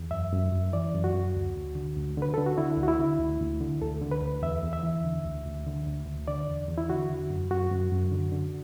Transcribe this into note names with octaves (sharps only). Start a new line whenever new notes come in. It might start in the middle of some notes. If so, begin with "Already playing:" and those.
Already playing: E2
F#2 E5
F#2
F#2
E3 D5
F#2
F#4
F#2
D2
D2
D3
D2
D3 B4
D3 A4
F#4
D3 E4
D2
F#4
E4
D3
D2
D2
D3
D2 A4
D3
B4
D2
E2 E5
E2
E5
E3
D3
D2
D2
D3
D2
D2
D3 D5
E2
E2
E4
D3 F#4
D3
F#2
F#2 F#4
F#2
F#2
D3
D3